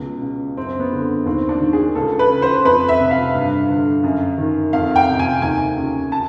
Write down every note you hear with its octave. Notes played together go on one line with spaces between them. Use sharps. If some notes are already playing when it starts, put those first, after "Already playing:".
Already playing: C#2 B2
C#3
F#2 C4
B3
D3
D#2 C4
D4
D#3
G#4
C#2 A4
B4
C#3
C5
F2 B4
E5
C3
F5
G2
D3
F#2
D#3
F2 F5
G5
C3
G#5
D#2 G#5
C#3
A5